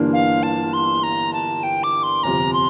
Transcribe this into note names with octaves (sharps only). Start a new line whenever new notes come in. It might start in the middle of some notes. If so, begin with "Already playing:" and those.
Already playing: G1 G2 E3 A#3 D4
F5
A5
C6
A#5
A5
G5
D6
C6
G1 F2 C3 A#5
C6